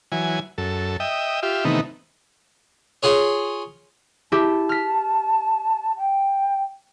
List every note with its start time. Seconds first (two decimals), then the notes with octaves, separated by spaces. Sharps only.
0.12 E3 F#3 G#5
0.58 F#2 A4
1.00 D#5 E5 G5
1.43 F4 G4 E5
1.65 C3 D#3 E3 A3 B3 D#4
3.03 F4 G#4 C#5
4.32 E4 G4 A5
4.69 F6 B6
5.98 G5